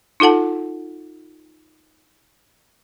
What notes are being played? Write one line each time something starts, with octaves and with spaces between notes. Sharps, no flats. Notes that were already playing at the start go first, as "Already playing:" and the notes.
D#4 F4 A4 F#5 A5